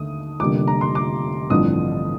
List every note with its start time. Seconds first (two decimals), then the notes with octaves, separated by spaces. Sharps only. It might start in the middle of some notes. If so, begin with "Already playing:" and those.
Already playing: D#2 D3 A3 D#6
0.40 F1 F2 D3 G3 A#3 D6
0.67 A#5
0.81 C6
0.95 D6
1.50 A1 G2 D3 F3 C4 D#6